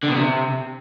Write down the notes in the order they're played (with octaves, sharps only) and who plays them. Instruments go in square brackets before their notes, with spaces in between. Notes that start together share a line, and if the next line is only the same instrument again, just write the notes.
[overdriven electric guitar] D3
B2
C3